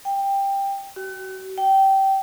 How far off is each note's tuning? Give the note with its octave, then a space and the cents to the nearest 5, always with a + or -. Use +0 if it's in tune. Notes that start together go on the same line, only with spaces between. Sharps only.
G5 +10
F#4 +40
G5 -20